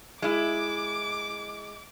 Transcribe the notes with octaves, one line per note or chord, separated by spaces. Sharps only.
G#3 E4 D6